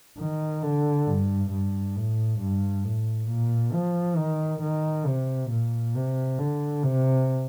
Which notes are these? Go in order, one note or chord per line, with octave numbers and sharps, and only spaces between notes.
D#3
D3
G2
G2
A2
G2
A2
A#2
F3
D#3
D#3
C3
A#2
C3
D3
C3